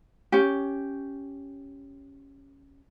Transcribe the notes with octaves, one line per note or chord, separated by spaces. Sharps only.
C#4 G4